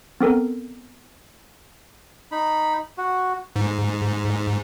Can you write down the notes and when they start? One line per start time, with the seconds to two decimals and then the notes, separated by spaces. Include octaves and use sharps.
0.21 B3 C4 A4 A#4
2.32 D#4 B5
2.98 F#4
3.56 G#2